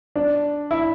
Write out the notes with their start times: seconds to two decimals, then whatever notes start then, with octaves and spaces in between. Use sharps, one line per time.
0.16 D4
0.71 E4